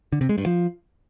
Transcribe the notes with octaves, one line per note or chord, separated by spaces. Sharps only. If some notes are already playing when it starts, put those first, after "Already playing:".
D3
C3
G#3
G2
F3